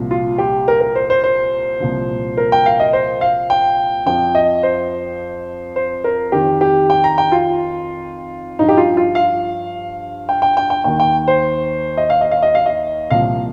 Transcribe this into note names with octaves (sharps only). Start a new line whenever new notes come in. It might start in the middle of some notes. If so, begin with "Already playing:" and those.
Already playing: C2 A#2 F3
F4
G4
A#4
A#4
C5
C5
C5
C2 A#2 F3
A#4
G5
F5
D#5
C5
F5
G5
F2 F3 G5
D#5
C5
C5
A#4
F2 D#3 G4
G4
G5
A#5
G5
F4
G2 F3 D#4
G4
F4
F4
F5
G5
G5
G5
G5
D#2 D#3 G5
G5
C5
D#5
F5
D#5
F5
D#5
F5
D#5
C2 A#2 F3 F5